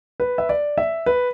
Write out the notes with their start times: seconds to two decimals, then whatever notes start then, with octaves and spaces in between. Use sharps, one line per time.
0.20 B4
0.38 E5
0.49 D5
0.78 E5
1.06 B4